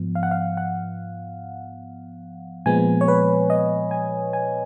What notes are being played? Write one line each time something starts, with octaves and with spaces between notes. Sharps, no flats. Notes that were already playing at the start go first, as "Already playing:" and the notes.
Already playing: G#2 F3 B3
F5
F#5
F5
F#5
A#2 F3 G#3 B3 G#5
C#5
B4
D#5
G#5
G#5